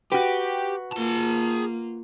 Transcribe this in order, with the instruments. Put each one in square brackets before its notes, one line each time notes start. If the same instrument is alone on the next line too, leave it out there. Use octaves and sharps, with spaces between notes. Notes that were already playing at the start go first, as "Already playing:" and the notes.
[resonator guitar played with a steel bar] F#4 B4 [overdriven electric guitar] G4
[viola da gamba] A#3 F4 [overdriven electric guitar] G#4 A5